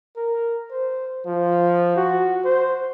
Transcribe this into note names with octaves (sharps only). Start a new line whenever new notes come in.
A#4
C5
F3
F#4
C5